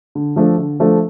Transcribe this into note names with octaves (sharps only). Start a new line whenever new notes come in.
D3
F3 A3 D4 A4
D3
F3 A3 D4 A4